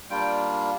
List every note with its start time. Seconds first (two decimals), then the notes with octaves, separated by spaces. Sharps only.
0.10 G3 A#3 D4 F4 G5